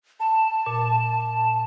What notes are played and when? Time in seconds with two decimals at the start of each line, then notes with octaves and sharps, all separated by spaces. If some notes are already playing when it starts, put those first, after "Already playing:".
0.20 A5
0.66 A#2